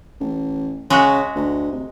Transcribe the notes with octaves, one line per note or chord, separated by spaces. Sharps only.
A1
C#3 G#3 F#4 E5
D2
C3